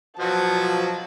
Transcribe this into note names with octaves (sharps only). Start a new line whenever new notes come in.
B2 F3 F#3 F#4 A5